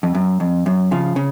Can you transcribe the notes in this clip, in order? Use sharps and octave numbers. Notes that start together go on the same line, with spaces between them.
F2
F#2
F2
F#2
C#3 F3
C#3